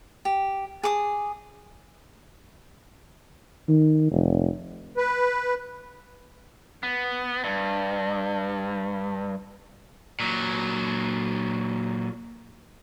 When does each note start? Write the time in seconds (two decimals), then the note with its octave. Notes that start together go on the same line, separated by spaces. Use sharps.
0.25 G4
0.83 G#4 A5 D6 D#6
3.68 D#3
4.11 F1
4.97 B4
6.83 B3
7.44 G2
10.20 A#2 F#3